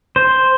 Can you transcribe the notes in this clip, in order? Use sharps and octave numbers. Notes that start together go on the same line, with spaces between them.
C5